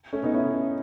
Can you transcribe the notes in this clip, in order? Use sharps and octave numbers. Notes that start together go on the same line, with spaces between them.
A3 C#4
B3 D#4
C#4 E4